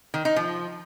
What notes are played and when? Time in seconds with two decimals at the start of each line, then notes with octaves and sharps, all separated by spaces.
0.14 D#3
0.25 D#4
0.36 F3